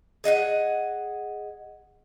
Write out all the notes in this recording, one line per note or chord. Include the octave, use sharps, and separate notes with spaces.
G#4 D#5 F5 F#5